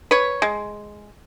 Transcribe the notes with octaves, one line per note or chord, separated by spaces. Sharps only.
B4 C#5
G#3